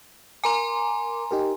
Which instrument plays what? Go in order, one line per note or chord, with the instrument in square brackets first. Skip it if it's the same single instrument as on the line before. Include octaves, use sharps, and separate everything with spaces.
[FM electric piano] A#4 D6 [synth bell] G#5 A#5 C6
[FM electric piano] D#4 G4 A#4